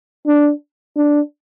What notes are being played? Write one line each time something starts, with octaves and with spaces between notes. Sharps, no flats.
D4
D4